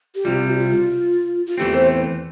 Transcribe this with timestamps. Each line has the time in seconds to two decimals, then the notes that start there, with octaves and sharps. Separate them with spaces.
0.15 G4
0.25 C2 C3 G3 F4
0.50 G4
0.58 F4
1.46 F4
1.58 E2 E3 A3 C4 G4
1.75 C5